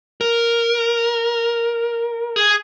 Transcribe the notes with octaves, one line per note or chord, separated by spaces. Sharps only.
A#4
G#4